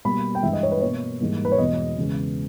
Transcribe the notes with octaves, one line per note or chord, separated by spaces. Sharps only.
B2 G3 A#3 B5
G5
G2 E3 G#3 E5
D#5
C#5
B4
B2 A#3 C#5
G#2 E3 G3 A#3
B4
C#5
E2 B2 G#3 B3 D#5
E2 C#3 G#3 B3